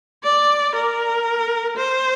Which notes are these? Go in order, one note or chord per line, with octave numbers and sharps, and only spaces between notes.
D5
A#4
C5